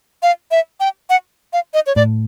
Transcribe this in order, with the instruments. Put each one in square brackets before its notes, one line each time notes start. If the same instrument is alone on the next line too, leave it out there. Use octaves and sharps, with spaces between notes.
[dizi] F5
E5
G5
F#5
F5
D#5
C#5
[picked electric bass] A2 [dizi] D5